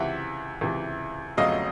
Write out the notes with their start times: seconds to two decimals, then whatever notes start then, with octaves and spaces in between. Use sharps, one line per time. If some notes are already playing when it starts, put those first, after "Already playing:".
Already playing: C#2 C3 E3 E5 F#5
0.61 C#2 C3 E3
1.37 G1 F2 C#3 F#3 A3 D#5 F5